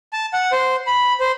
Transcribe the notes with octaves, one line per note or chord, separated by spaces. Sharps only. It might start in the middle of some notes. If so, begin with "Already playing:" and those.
A5
F#5
C5
B5
C5